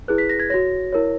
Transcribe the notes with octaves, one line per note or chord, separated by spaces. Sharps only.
E4 G#4 B4 F#6
B6
A#6
G#6
F#4 C#5 A#6
E4 A#4 C#5